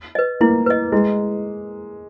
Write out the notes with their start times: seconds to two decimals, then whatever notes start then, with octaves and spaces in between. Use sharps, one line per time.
0.15 B4 D#5
0.41 A#3 E4
0.66 B4 D#5
0.92 G#3 E4